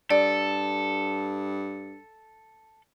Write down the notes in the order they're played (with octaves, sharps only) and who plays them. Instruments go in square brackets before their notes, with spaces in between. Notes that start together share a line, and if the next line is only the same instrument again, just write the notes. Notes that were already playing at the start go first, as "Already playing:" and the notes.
[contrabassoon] G2 [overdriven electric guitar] A4 [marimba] D5